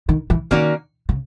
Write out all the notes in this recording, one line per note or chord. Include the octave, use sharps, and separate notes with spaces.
D#3
E3
D#3 A#3 C#4 F#4 A#4 D5
C#3